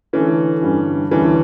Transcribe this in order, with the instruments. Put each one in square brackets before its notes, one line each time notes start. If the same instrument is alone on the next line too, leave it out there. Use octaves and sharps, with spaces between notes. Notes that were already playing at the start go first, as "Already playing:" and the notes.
[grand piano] D3 A3 C#4 [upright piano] E3
[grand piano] G2 D3 G3 C#4
[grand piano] D2 D3 G3 C#4 [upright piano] E3